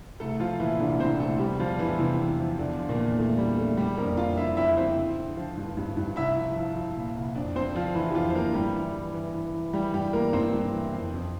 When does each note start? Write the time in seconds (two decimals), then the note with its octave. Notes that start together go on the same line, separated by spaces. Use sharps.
0.20 C2 A3 A4
0.40 F3 F4
0.60 A#2 E3 E4
0.79 C2 D3 D4
1.00 C2 C4 C5
1.19 C2 A3 A4
1.39 E2 G3 G4
1.59 E2 F3 F4
1.79 D3 E3 E4
1.99 E2 C3 C4
2.19 E2
2.39 F3
2.58 E2 D3 D4
2.79 F3
2.89 A#2 A#3
2.98 E2
3.18 E2 A3
3.38 D3 G3
3.58 E2 A3
3.77 D3 G3 G4
3.97 F2 A#3 A#4
4.17 F2 F4 F5
4.37 D3 E4 E5
4.57 F2 E4 E5
4.77 F2 C4 C5
4.97 D3
5.17 D3
5.37 F3
5.57 G2
5.77 G2
5.97 G2
6.16 C2 E4 E5
6.36 F3
6.56 F3
6.75 F3
6.97 A#2
7.16 C2
7.35 F2 D4 D5
7.56 F3 C4 C5
7.75 D3 F3 F4
7.95 E3 F3 E4
8.11 G4
8.15 F2 F3 F4
8.30 C5
8.35 D3 A#3 A#4
8.54 G2 G3 G4
8.74 E3
8.94 E3
9.14 E3
9.34 E3
9.54 E3
9.73 E3 G3 G4
9.94 G2 G3 G4
10.13 E3 A#3 A#4
10.33 G2 C4 C5
10.54 G2
10.73 E3
10.93 F2
11.14 F2